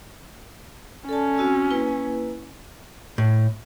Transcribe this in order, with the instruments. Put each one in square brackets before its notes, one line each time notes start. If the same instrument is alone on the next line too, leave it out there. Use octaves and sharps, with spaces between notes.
[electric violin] C#4 [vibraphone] A4 D5 A5
[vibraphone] C4 F#4 E6
A#3 E4 B4
[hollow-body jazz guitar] A2